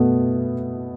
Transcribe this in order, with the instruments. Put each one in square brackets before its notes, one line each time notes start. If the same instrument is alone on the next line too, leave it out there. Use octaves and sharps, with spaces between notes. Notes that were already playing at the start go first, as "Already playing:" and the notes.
Already playing: [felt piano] B2 A3 B3